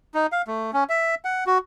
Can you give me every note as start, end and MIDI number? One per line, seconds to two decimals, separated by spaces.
0.14 0.27 63
0.32 0.42 77
0.47 0.71 57
0.73 0.84 61
0.89 1.15 76
1.25 1.44 78
1.46 1.58 66